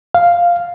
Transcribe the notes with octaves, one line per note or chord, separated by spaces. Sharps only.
F5